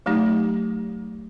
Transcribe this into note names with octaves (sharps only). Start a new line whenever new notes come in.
F#3 A3 D#4 G4